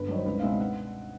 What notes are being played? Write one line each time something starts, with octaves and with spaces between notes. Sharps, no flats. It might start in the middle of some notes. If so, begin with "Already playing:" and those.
Already playing: G1 B4
G2 D#3 F#3 C#5
C5
C#2 B4
F5
B2 G#3 C4 D#4 E5
F#5